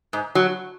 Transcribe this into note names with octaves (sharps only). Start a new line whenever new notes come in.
G#2
F#3